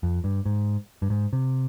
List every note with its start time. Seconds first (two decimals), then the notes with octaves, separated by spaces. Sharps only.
0.03 F2
0.24 G2
0.46 G#2
1.02 G2
1.10 G#2
1.33 C3